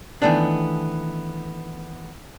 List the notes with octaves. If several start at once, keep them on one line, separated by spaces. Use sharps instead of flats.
D#3 E3 A3 B3 D4